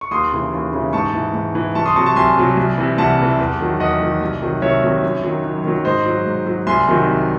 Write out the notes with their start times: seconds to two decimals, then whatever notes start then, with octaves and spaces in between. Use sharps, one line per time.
0.01 C#6
0.11 D#2 C6 D#6
0.32 C#3 E3
0.53 D#2
0.73 C#3 E3
0.93 G#2 A5 C#6
1.13 E3
1.34 G#2
1.55 E3
1.75 C2 A5 C#6
1.85 C6 D#6
1.96 C3 F#3 A5 C#6
2.06 A5 C#6
2.16 C2 G#5 C6
2.37 C3 F#3
2.57 C2
2.78 C3 E3
2.98 C2 F#5 A5
3.19 C3 E3
3.39 E2
3.60 D#3 F#3
3.80 E2 D#5 F#5
4.00 D#3 F#3
4.21 C2
4.42 C3 D#3 F#3
4.62 C2 C#5 E5
4.83 C3 D#3 F#3
5.02 F#2
5.23 D#3 F#3
5.44 F#2
5.64 D#3 F#3
5.85 G#2 C5 D#5
6.06 F#3
6.26 G#2
6.46 F#3
6.67 C2 G#5 C6
6.88 C3 D#3 F#3
7.08 C2